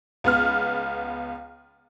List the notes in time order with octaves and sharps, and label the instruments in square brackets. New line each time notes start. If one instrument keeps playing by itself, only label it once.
[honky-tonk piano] C#2 B3 F6